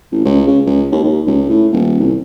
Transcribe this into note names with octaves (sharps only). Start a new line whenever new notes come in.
A1
C#2
C#3
C#2
D#2
D#2
C#2
A2
D#1
C2